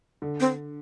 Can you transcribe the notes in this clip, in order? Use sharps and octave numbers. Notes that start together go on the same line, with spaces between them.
D3
C4